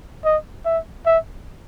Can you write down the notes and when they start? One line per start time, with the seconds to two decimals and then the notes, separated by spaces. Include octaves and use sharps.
0.25 D#5
0.66 E5
1.06 E5